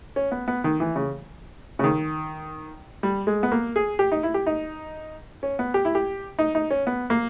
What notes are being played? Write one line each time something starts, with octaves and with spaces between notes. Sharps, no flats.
C#4
B3
B3
D#3
E3
C#3
C#3
D#3
G3
G#3
B3
A#3
G#4
G4
D#4
E4
G4
D#4
C#4
B3
G4
E4
G4
D#4
D#4
C#4
B3
A#3